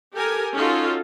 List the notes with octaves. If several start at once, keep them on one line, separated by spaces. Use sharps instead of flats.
G4 A4 A#4 G#5
C#4 D#4 F4 F#4 A4